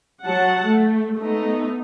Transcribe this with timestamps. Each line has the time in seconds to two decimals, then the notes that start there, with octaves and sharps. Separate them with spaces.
0.24 F#3 F#5 A5
0.67 A3
1.16 A3 B3 D#4